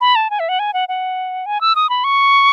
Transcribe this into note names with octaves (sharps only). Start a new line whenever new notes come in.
B5
A5
G#5
E5
F#5
G#5
F#5
F#5
G#5
E6
D#6
B5
C#6